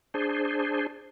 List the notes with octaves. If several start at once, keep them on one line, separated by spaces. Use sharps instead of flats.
D4 G#4 C5